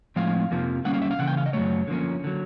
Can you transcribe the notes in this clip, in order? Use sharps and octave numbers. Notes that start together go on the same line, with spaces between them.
A2 F3 G#3 C4 F5
F2 C3 F3 A#3
D3 G3 A#3 C#4 F#5
F5
E5
F5
C#3 E3 F#5
G5
F5
D#5
F#2 D#3 F#3 A3 C#5
D3 F3 A#3 C#4
D3 F#3